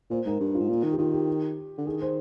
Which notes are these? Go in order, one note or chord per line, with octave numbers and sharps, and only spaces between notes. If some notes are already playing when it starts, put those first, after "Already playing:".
A#2 C5
G#2 A#4
G2
G#2 F4
A#2
D#3
G4
D#3 F4
G4
D3
D#3 G#4
C5